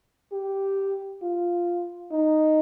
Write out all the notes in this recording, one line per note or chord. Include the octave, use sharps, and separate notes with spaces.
G4
F4
D#4